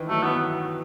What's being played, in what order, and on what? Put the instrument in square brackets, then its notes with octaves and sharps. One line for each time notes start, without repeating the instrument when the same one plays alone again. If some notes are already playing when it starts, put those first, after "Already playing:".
Already playing: [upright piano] D#3 E3
[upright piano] F#3 [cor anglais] A3
[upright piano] E3 [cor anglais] B3